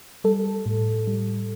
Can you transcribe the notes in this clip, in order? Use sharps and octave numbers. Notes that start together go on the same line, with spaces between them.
G3 A4
A2
G3